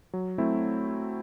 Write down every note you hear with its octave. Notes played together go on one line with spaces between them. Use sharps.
F#3
A3 C4 E4